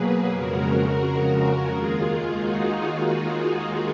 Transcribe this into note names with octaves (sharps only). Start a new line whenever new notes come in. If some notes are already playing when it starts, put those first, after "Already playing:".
Already playing: B2 F#3 A#3 G#4 B4
F2 C#3 G#3 F#4 A#4
F#4 A#4
D#2 D#3 G#3 F4 G#4
D#4 F#4